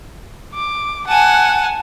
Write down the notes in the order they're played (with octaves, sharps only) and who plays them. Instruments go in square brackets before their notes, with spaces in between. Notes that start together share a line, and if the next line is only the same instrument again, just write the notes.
[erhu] D6
[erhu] F#5 [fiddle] G#5 A5